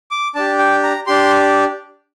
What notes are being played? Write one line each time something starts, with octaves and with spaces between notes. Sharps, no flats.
D6
D4 G4 A5
G5
A#5
D4 G4 C6